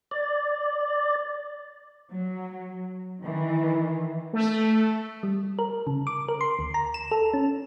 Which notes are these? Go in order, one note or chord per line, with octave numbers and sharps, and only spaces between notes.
D5
F#3
D#3 E3
A3
G3
A#4
C#3
D6
A#4
C6
D2
A#5
E7
A4
C#4